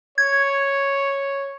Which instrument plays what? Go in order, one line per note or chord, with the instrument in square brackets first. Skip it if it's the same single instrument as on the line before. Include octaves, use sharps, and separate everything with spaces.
[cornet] C#5 [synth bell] G#6